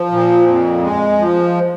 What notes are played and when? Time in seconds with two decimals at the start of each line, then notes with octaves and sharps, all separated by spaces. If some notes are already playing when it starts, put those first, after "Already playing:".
Already playing: F3
0.11 A#2
0.47 F2
0.82 G#3
1.18 F3